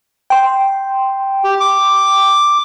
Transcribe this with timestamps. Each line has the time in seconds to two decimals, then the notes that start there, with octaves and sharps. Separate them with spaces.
0.30 G5 C6
1.44 G4
1.60 D6